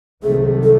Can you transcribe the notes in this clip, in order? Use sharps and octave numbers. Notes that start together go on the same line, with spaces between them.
C2 C3 D#3 F#3 A3 G#4
A4